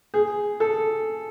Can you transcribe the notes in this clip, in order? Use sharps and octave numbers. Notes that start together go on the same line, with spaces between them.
G#4
A4